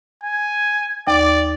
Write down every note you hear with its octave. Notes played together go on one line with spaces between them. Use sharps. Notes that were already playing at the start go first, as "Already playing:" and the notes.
G#5
D#2 D5